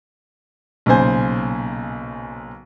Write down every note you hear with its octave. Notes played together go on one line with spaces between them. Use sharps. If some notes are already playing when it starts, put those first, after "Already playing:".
B1 A#2 C#3 C5 G#5